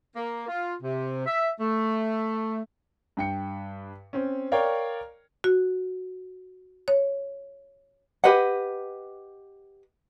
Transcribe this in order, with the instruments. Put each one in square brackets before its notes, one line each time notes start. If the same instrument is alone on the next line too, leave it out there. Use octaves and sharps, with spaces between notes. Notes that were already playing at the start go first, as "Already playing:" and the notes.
[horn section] A#3
F4
C3
E5
A3
[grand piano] G2 G5 C#7
C4 C#4
A#4 C#5 D5 F5 G5
[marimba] F#4
C#5
[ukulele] G4 B4 D#5 F#5